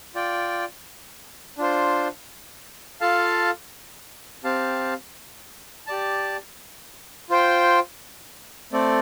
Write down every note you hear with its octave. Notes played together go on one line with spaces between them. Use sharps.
F4 D5 G5
D4 F4 C5
F4 A4 F5 A5
C4 G4 F5 A5
G4 D5 A5
F4 C5 G5
A3 C4 A4 D5